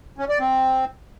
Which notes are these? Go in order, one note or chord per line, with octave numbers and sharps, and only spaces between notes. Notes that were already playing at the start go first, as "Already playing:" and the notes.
C#4
D5
C4